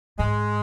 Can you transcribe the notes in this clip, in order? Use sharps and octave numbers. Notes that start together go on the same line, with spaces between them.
G#2 G#3